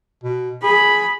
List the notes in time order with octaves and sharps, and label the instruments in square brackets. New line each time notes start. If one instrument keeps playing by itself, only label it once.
[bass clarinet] B2
[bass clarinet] G#4 [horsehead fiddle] B5